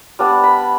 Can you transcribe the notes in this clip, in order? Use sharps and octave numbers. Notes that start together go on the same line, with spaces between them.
G3 B3 D4
B5